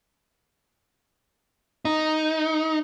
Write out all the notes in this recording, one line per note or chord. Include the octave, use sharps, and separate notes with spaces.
D#4